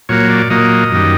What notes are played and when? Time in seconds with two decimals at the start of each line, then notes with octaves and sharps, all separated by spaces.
0.09 A#2 F#3 A#3 C#5
0.30 D5
0.50 A#2 F#3 A#3 D#5
0.92 F#2 D#3 G3